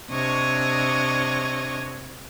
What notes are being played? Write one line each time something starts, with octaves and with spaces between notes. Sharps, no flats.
C3 D4 C#5 D#5 C#6